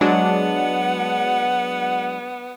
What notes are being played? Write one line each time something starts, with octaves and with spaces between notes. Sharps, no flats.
F#3 G#3 B3 D4 F#5